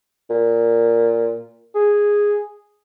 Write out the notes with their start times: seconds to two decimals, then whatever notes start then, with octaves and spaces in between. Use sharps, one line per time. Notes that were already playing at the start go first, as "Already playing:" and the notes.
0.30 A#2
1.75 G#4